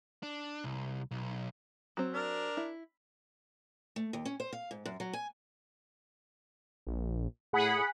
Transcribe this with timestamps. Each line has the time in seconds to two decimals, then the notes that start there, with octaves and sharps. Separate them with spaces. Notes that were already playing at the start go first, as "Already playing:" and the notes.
0.23 D4
0.64 C2
1.11 B1
1.97 F#3 C4
2.14 D4 A#4
2.57 E4
3.96 A3
4.13 D#2
4.25 C#4
4.40 C5
4.53 F5
4.71 G#2
4.86 F#2
5.00 F#3
5.13 G#5
6.87 A#1
7.53 A2 G#4 F#5 B5